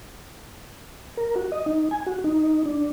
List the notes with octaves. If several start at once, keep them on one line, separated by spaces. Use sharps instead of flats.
A#4
F#4
D#5
D#4
G#5
F#4
D#4
D4